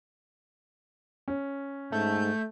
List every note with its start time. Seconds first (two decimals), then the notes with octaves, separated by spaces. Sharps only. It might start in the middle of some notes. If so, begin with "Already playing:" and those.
1.28 C#4
1.92 G#2 A3 G6